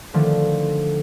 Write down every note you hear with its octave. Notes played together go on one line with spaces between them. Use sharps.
D3 D#3 F3 A3